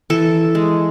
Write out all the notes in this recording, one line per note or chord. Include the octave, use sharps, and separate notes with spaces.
E3 A4
G#3